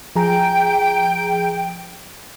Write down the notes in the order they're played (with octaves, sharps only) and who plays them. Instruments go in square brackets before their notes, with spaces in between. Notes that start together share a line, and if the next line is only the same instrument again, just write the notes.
[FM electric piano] F3 G#4 A#5 [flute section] G5